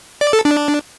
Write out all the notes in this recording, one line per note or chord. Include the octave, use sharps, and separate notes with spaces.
D5
A4
D4